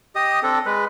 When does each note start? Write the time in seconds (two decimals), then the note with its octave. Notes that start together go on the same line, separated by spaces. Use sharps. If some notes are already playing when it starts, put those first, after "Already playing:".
0.15 G4 D#5 D#6
0.43 C4 D4 A4
0.66 G#3 B4